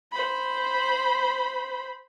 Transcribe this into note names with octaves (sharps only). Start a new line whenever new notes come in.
C5 B5